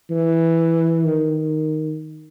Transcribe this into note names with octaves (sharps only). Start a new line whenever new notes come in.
E3
D#3